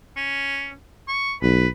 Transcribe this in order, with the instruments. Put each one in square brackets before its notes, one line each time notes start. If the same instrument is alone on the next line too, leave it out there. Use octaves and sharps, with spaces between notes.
[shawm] C#4
C#6
[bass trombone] B1 [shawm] B4